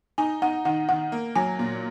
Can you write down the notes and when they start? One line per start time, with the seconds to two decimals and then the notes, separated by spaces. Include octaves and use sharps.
0.18 D#4 G#5
0.42 D#4 F#5
0.65 D#3 F#5
0.88 D#3 F#5
1.12 A#3
1.36 F#3 G#5
1.59 A#2